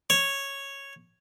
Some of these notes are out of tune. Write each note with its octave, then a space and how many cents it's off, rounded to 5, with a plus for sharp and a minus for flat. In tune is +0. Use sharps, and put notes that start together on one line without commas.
C#5 -5